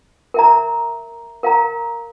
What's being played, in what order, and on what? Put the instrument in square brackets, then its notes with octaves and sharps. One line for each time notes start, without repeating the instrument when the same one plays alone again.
[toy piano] A#4 E5 A#5
A#4 F5 A#5